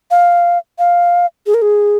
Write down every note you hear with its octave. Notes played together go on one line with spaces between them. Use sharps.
F5
F5
G#4
A#4
G#4